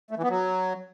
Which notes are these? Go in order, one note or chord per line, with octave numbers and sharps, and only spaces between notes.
A3
E3
B3
F#3